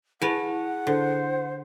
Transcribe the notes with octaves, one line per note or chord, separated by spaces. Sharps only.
E4 G#4 B4 F#5 G#5
D3 C5